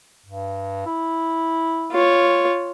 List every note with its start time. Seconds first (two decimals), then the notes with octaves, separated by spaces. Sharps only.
0.26 G2
0.86 E4
1.92 F4 C#5